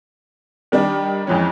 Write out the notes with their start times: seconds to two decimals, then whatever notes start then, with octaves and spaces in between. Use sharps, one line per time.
0.72 D#3 G3 D4
1.27 F2 G#2 E3 F3 C#4